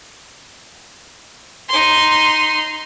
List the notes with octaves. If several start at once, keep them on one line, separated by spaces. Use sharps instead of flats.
D#4 C6